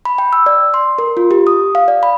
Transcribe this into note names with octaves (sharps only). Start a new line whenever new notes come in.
B5
G5
E6
D5
C6
A#4
F4
G4
D#6
F5
D5
B5